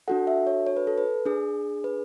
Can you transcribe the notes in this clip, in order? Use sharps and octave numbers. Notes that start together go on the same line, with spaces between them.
D4 F#4 A4 F#5
E5
C#5
C#5
B4
A4
B4
D4 G#4
B4